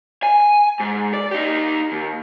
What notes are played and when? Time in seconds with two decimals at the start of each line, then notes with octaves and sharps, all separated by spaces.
0.23 G#5
0.80 G#2
1.13 D5
1.31 D#4 G4
1.92 D#2